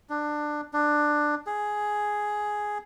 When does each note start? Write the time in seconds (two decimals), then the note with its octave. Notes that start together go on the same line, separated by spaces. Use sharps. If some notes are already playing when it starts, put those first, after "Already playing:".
0.10 D4
0.73 D4
1.47 G#4